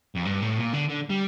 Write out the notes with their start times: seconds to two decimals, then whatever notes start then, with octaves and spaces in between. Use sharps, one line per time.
0.16 F2
0.26 G2
0.42 A2
0.58 A#2
0.74 D3
0.89 D3
1.10 G3